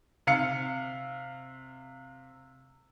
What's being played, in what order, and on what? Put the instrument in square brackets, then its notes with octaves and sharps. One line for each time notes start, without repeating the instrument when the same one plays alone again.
[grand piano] C3 F5 C#7